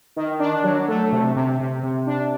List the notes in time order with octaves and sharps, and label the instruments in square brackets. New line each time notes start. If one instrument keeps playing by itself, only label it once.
[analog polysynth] D#3
D4
F#3
A3
C3
C3
C3
C3
D4